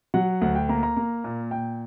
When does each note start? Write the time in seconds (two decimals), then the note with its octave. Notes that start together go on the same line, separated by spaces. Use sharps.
0.14 F#3 F#5
0.41 D2 F#5
0.55 G5
0.69 A#3 A#5
0.83 A#5
0.96 A#3
1.24 A#2
1.51 A#2 G5